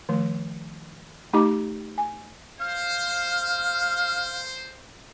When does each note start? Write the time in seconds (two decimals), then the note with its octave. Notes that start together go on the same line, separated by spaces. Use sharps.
0.09 D#3 F3 A3
1.33 A3 D#4 G4 D#5 A#5 D6
1.98 G#5
2.61 C5 F5